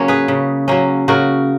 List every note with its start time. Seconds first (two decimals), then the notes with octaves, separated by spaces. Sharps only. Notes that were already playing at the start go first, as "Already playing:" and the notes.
Already playing: C#3 F#3 A#3 C#4 C#5
0.08 G#4 B4
0.28 C#3
0.68 F#3 A#3 C#4
1.08 C#3 F#4 A#4